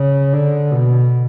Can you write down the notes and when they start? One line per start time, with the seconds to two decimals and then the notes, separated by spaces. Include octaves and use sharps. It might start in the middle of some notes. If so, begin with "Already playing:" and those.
Already playing: C#3
0.34 D3
0.72 B2